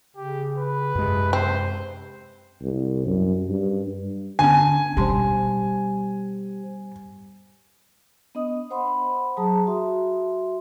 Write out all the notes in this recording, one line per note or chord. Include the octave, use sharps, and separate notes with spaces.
C#3 G4
B4
F#2 C3 G#3
C4 C5
C2
F#2
G2
D3 B3 C#4 D4 G#5 A5
B2 G3 G4 C5 A5 C6
B3 D4 D#5 D#6
C5 F#5 B5 C6
F#3 G#4 A5 A#5 D#6
F#4 E5 C6